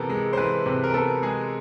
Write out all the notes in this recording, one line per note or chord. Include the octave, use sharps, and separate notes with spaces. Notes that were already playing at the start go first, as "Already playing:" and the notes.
Already playing: C3 E3 B3 A4 A#4
G#3
C5
E3 B4
C3
A#4
B3 A4
G#3 G#4